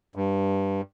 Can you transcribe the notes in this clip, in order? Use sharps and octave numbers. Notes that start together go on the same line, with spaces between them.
G2